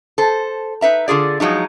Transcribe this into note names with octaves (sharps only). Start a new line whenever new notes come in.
A4 C5
D#4 B4 E5 A#5
D3 F4 G#4 D5
F3 F#3 G#3 D#4